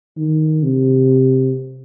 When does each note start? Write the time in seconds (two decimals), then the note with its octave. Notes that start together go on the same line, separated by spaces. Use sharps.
0.17 D#3
0.63 C3